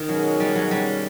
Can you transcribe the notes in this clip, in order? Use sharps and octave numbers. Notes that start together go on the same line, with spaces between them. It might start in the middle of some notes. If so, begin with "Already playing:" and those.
Already playing: D#3
B2 F#3 G#3 C#4
G3
F#3
G3